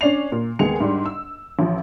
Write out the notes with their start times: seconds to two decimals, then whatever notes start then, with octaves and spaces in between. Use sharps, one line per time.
0.01 C#4 D4 D5 C7 F7
0.32 A#2
0.59 D#2 G#3 B3 G#4 C#7 F7
0.80 G#2 G3 D4
1.06 E6
1.59 A1 F3